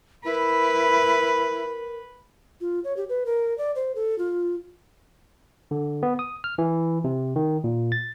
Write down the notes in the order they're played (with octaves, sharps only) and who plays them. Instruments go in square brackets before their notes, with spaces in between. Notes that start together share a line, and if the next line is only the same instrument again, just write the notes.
[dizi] E4 [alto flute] A#4 [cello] B4
[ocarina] F4
C#5
G4
B4
A#4
D5
C5
A4
F4
[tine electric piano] D3
B3
D#6
F6
E3
C3
D#3
A#2
A6